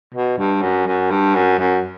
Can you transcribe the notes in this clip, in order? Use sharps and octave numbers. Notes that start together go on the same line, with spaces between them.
B2
G2
F#2
F#2
G2
F#2
F#2